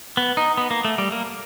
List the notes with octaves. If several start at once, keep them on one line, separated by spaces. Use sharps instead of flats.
B3
D#4
B3
A#3
A3
G3
A#3